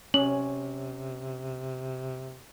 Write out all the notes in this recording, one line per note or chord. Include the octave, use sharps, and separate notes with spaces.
C3 C#4 F#7